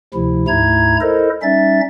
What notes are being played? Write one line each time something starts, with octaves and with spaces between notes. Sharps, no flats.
D2 C3 F3 E4
D2 G#2 A3 E4 A#5 G#6
E4 A4 A#4 C5 D#5
G3 C#4 D#4 E5 A6